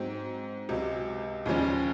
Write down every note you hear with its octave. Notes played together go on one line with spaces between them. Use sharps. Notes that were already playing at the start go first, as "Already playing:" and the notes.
Already playing: G#2 F#3 C4
C#2 C3 F#3
D#2 C#3 F3 G#3 C#4